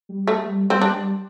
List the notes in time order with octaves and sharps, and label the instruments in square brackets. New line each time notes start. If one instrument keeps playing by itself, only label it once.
[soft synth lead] G3
[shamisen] A3
[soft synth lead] G3
[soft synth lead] G3 [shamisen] C4
[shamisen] D4
[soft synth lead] G3